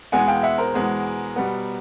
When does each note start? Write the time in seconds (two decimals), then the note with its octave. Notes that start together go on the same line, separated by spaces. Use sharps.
0.12 E2 B2 G#3 B3 F#5 G#5
0.28 F5 G5
0.43 E5 F#5
0.58 A#4 C5
0.74 E2 B2 G#3 B3
1.36 B2 G3 B3